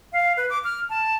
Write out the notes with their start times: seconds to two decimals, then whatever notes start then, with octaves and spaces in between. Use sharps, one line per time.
0.13 F5
0.37 B4
0.50 D6
0.64 F6
0.90 A5